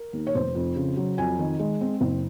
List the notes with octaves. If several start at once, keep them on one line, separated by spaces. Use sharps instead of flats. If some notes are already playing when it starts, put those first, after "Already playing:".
Already playing: A#4
D#2
C#5
F1 C5
F2
C#3
F#3
F2 G#5
D#3
G#3
C4
F#1